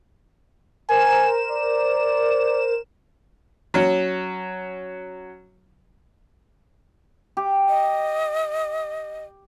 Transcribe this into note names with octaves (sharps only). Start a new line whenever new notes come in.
A#4 C5 G#5 E7
D5
F#3 C#4
G4
D#5